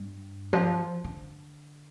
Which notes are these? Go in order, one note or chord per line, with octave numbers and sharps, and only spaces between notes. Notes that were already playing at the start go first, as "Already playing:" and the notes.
Already playing: G2
F3
D3